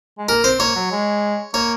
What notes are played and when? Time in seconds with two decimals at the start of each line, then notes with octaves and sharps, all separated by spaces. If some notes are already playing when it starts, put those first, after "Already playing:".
0.18 G#3
0.29 A#3 A#4
0.44 C4 C5
0.60 A#3 C#5
0.76 F#3
0.92 G#3
1.54 A#3 C#5